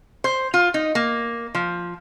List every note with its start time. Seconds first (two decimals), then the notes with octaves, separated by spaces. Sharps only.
0.24 C5
0.54 F4
0.74 D#4
0.95 A#3
1.55 F3